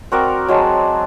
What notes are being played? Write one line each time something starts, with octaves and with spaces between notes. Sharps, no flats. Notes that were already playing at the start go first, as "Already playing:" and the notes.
C4 F#4 A#4 D5
F#3 G#3 C5 A5